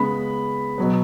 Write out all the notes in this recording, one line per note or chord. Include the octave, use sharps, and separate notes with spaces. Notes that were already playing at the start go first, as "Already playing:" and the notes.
Already playing: C#3 G#3 B3 B5
B2 F#3 B3